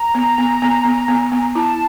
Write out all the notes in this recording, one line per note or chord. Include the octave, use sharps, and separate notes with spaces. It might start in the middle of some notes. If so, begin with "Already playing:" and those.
Already playing: A#5
B3
B3
B3
B3
B3
B3
E4 A5